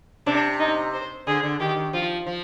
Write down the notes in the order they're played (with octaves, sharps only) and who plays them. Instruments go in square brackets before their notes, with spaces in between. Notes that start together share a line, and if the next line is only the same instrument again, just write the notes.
[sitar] C3 [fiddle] D4
[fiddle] D#4
C5
[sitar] D3 [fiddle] G#4
[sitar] D3
[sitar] D#3 [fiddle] G4
[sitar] D#3
[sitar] F3 [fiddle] F4
[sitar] F3